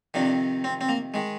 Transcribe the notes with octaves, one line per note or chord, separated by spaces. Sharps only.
F2 C3 D#3 D4
C4
C4
A#3
D#3 G#3